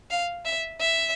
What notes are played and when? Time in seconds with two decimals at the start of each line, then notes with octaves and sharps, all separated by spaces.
0.10 F5
0.45 E5
0.80 E5